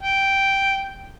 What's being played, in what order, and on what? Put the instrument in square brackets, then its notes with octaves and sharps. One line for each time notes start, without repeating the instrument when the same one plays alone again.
[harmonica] G5